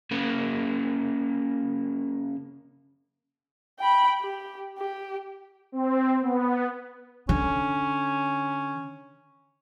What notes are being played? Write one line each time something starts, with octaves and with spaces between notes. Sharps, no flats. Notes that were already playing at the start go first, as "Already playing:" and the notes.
C#3 A#3
G5 B5
G4
G4
C4
B3
D3 C#4